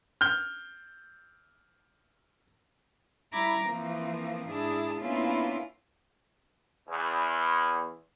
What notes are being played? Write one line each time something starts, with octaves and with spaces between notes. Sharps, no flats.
F6 G6 G7
G3 E4 A#5 B5 D6 G#6
E3 F3 A#3 C4
G#2 D4 E4 G#4 A5
A#3 B3 C#4 D4 E4 F4
E2